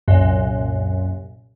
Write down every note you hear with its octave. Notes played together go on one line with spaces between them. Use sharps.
C2 F#2 A#2